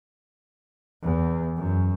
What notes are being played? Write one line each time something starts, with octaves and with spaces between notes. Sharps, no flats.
E2
F#2